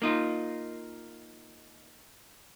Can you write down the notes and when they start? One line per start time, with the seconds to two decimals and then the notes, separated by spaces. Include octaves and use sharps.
0.02 A#3 D#4 F4